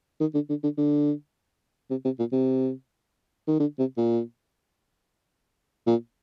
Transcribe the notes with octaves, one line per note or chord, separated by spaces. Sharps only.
D#3
D3
D3
D3
D3
C3
C3
A#2
C3
D#3
D3
C3
A#2
A#2